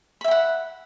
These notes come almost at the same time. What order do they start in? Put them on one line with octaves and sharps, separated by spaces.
B5 E5 G5 F#5